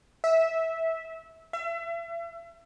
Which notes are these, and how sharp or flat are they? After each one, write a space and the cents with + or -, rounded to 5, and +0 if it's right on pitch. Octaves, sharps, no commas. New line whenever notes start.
E5 -15
E5 +35